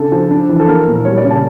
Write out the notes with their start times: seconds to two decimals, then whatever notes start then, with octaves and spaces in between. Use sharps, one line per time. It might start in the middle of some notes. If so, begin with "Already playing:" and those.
Already playing: C#3 D4 A4
0.12 F3
0.31 D4
0.49 E3
0.59 A4
0.68 A#3 A#4
0.87 A#2
0.95 A#4
1.05 G3 C#5
1.17 D5
1.24 C#3
1.31 A5